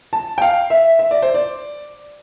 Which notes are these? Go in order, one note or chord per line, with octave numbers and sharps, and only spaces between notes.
A5
G5
F5
E5
E5
D5
C5
D5